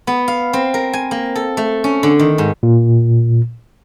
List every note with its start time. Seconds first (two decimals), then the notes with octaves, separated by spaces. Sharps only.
0.07 B3
0.28 F5
0.53 C4
0.74 A#4
0.93 G#5
1.11 A#3
1.35 A4
1.57 A3
1.84 C#4
2.03 D3
2.19 D#3
2.38 G#2
2.63 A#2